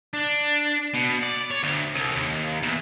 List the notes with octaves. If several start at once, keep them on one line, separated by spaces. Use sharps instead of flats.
D4
B2
D5
C#5
D2
C2
D#2
E2